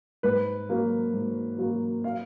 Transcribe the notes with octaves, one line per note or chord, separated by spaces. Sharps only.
G#2 B4
F#3 A#3
G#2
F#3 A#3
F5